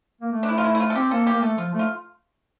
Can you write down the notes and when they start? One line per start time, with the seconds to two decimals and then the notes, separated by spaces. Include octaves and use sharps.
0.21 A#3
0.33 A3
0.43 D4
0.49 E4
0.58 F4
0.64 E4
0.75 E4
0.80 F4
0.90 A4
0.96 C4 G4
1.11 A#3 A4
1.27 G4
1.32 A#3
1.42 A3 A4
1.58 F3 F4
1.74 A3
1.79 F4